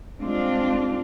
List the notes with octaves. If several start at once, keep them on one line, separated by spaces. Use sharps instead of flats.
G3 G#3 C4 D4 F4